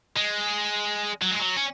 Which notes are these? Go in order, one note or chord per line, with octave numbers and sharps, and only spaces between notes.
G#3
F#3
G#3
F#3
C#4